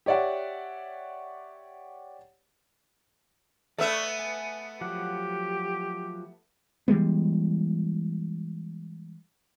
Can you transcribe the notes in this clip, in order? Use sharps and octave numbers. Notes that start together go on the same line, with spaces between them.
G4 C#5 D5 E5 F#5
A3 B3 D5 E5 C#6
G#5
F3 F#3 G4 F#5
E3 G3 G#3 B3